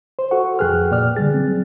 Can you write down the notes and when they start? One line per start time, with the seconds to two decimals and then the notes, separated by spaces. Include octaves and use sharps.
0.19 C5
0.31 F#4 A4 F#5 C#6
0.59 F2 G#4 B4 G5 F6 F#6
0.91 A#2 D5 F6
1.16 D3 G3 G#4 A6
1.34 F#3 C4